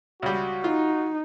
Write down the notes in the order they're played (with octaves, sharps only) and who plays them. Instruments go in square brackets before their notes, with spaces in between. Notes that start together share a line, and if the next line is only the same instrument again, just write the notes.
[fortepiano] C#2 G3 [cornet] F#4
[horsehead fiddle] D#4 [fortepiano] F4